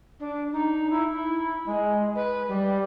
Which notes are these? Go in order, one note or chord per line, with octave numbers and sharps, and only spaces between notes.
D4
D#4
E4
E4
G#3
B4
G3